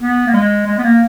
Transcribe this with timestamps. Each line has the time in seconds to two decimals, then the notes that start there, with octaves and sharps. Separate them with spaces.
0.01 B3
0.27 A#3
0.34 G#3
0.67 G#3
0.78 B3
0.84 A#3